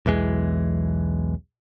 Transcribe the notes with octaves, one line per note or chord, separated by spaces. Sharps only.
B1 E2 E3 G#3